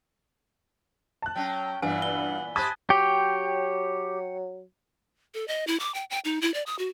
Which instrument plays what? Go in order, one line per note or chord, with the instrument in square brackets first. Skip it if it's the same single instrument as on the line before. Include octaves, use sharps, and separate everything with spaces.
[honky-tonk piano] A5 F#6
[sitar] F#3 C#4 [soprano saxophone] G5
[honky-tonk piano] G2 [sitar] A#2 E3 B3 [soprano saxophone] F#5 [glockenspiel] G#5
[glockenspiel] G7
[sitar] G4 C5 [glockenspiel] A5 F#6 [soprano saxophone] B5 [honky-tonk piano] D#6 G#6 A6
[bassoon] F#3 [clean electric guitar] G4 [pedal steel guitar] C#5 G5
[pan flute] A4
D#5
E4
D6
G5
G5
D#4
E4
D5
D#6
F#4